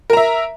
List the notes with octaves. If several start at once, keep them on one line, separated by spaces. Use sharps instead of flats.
A#4 E5 A#5